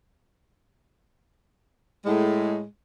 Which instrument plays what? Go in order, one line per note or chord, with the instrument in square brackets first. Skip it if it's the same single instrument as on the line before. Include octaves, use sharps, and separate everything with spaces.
[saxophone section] A2 G#3